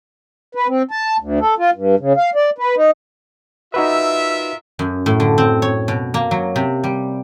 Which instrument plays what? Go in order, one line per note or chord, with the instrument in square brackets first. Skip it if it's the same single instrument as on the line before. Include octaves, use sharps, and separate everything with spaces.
[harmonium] B4
C4
A5
D2
A4
F4
G2
C#3
F5
D5
B4
D#4
[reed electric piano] D#4 F#4 B4 [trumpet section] F4 A#4 E5 [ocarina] E6
[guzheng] F#2
A2
D3
C4
C#5
B2
A#3
F#3
C3
G3